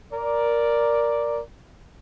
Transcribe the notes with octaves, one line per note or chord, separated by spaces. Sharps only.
A#4 D5